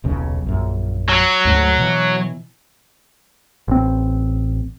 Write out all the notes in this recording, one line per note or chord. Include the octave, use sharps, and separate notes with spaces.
D#1 B1 C#3
A#1 F#2
F#3
D2 G#2 A3
B2 E3
A1 C4